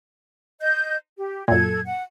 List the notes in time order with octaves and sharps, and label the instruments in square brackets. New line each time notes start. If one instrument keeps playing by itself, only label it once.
[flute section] D#5 G6
G4
[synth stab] F#2 A#2 [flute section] A4 G#6
[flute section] F#5